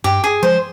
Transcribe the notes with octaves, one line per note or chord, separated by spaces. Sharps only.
G2 G4
G#4
F3 G#3 C5